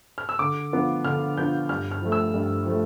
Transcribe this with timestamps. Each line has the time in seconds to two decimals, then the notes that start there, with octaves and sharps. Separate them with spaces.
0.18 F6
0.29 E6
0.39 D3 D6
0.73 F3 B3 D4 F4
1.05 D3 F6
1.37 F3 B3 D4 F4 G6
1.69 G2 F6
1.91 F6
2.02 F3 A3
2.12 E6
2.34 G2
2.66 F3 A3